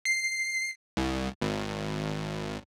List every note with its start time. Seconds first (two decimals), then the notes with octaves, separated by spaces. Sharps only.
0.05 C7
0.97 C2
1.42 G#1